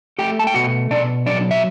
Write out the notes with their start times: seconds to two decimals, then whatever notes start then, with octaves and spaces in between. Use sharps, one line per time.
0.19 A3 G4 G5
0.39 A5
0.47 G5
0.54 B2 F#4 F#5
0.91 B2 D4 D5
1.26 F#3 D4 D5
1.51 E5